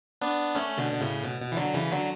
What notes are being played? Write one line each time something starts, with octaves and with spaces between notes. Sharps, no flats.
B3 D4
A3 C#4
B2 D3
B2
A2 C#3
B2
B2
E3
D3 F#3
C#3 E3
D3 F#3